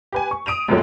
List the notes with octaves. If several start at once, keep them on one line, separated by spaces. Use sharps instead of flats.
G4 B4 G#5
C#6
D#6 D7 D#7 F7
C#2 F#2 A#2 F#3 G#3 A3